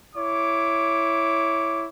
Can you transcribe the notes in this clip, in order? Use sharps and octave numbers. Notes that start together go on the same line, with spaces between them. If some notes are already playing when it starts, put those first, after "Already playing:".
E4 C#5 D6